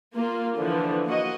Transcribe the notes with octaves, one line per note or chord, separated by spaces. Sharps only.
A#3 F4
D3 E3 F3
A#3 F#4 D#5